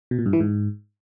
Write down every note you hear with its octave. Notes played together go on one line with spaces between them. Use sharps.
B2
A#2
G2
E3
G#2